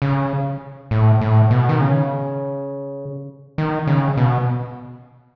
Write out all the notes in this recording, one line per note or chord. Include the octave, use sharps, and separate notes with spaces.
C#3
A2
A2
B2
D#3
C#3
D#3
C#3
B2